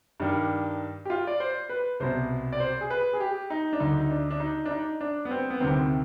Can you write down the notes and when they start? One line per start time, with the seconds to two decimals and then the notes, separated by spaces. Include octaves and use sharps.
0.20 G2 D#3 D4
1.05 G4
1.10 F4
1.27 D5
1.40 C5
1.70 B4
2.00 C2 B2 C5
2.53 D5
2.60 C5
2.81 G#4
2.90 B4
3.13 G#4
3.20 G4
3.50 D#4
3.73 D4
3.80 D2 D3 D#4
4.00 D#4
4.10 D4
4.30 D4
4.40 D#4
4.66 D4
4.71 D#4
5.01 D4
5.25 B3
5.31 C4
5.50 B3
5.60 D2 C3 D#3 C4